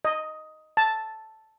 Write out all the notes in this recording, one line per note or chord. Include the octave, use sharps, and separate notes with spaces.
D#5
A5